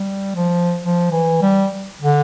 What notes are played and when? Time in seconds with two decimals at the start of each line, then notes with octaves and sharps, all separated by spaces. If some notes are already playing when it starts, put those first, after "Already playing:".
Already playing: G3
0.36 F3
0.82 F3
1.11 E3
1.42 G3
2.02 D3